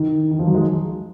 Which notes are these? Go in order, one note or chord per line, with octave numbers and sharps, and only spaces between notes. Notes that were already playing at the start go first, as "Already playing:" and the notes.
Already playing: D#3
D#3
F3
F#3
G#3